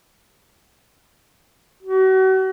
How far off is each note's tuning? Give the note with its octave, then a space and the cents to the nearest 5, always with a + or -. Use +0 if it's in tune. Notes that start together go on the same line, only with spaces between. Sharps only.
F#4 +35